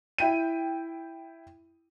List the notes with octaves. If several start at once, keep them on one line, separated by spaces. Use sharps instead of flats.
E4 G5 D#7